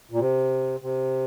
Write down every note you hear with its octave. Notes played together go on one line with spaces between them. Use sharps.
A#2
C3
C3